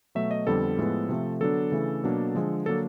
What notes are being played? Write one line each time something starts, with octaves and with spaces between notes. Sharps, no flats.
B2 F#3 A3 E5
D#5
F2 D3 G3 B3 A4
A2 F3 G#3 B3
C3 F3 A3
D3 F#3 B3 D4 A4
C#3 E3 A3 D4
B2 F#3 A#3 D4
D3 F3 G#3
D3 F#3 A#3 D4 A4